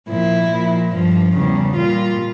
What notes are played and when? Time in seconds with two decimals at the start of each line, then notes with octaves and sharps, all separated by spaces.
0.08 A#2 F3 E4
0.51 A#2 F3
0.93 G2 F3
1.35 E2 C#3 G3
1.78 A#2 G3 F4